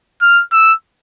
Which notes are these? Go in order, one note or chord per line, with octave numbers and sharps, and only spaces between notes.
F6
E6